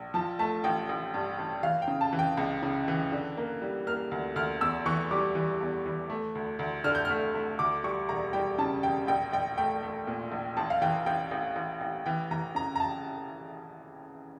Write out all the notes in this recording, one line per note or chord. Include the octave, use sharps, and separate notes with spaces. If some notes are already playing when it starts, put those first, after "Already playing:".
Already playing: A#1
F3 A5
A3 A5
A1 G5
A1
G2
A1
E3 F5
G5
C#3
A5
E3
G5
C#2
C#3
E3
D3
A#3
G3
A#3 F6
D2
D2 F6
E2 E6
E3 C#6
G3 D6
E3
E2
E3
A3
D2
D2
D3 F6
G6
A3 F6
A3
D2 D6
G3 C#6
E1 A#5
G3 G5
C#3 A5
E1 G5
A#1 G5
A#1 G5
A3 G5
A3
A#2
A#1
A1 A5
F5
E3 G5
A1 G5
A1
A1
A1
E3 G5
E3 A#5
C#3 A#5
A#5
A5